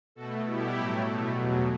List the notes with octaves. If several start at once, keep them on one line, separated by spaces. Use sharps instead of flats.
B2 A3 F#4 A4
B2 G3 E4 G4
A2 F#3 A3
B2 A3
E2 B2 F#3